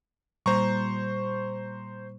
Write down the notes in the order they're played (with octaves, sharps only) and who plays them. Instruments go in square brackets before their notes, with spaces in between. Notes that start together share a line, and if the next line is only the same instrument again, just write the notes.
[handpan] A#2 G3 [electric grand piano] C5 A#5 C#6